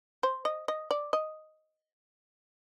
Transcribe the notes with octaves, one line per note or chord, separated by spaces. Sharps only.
C5
D#5
D#5
D5
D#5